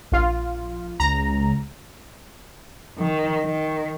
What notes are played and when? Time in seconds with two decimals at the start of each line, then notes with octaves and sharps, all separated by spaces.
0.12 A#1 F4
1.00 C#2 A#5
2.99 D#3
3.44 D#3